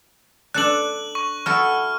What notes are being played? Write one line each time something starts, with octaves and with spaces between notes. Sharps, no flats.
D4 A4 D5 F#6 F#7
C#6
E4 F#4 A4 F6